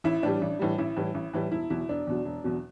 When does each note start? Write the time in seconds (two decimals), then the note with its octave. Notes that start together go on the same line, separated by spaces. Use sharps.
0.04 A1 E4
0.23 A2 E3 G3 D4
0.42 A1
0.59 A2 E3 G3
0.78 A1 E4
0.96 A2 E3 G3
1.14 A1
1.33 A2 E3 G3
1.51 E1 E4
1.70 E2 B2 F#3 E4
1.89 E1 D4
2.07 E2 B2 F#3
2.25 E1
2.44 E2 B2 F#3